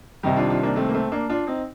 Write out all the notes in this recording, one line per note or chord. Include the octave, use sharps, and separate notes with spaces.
C2 C3 D#3 G3 D#4 G4
D4 F4
D4 F4
A#3 D4
A3 C4
A#3
A3 C4
A#3 D4
D4 F4
C4 D#4